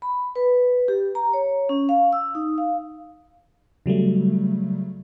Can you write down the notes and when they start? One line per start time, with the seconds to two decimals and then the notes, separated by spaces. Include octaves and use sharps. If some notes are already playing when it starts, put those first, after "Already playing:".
0.02 B5
0.36 B4
0.88 G4
1.15 A#5
1.33 C#5
1.69 C#4
1.89 F5
2.13 E6
2.35 D#4
2.58 F5
3.86 C#3 F#3 G3 A3